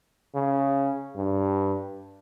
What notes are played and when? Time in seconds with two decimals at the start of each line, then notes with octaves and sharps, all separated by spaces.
0.34 C#3
1.16 G2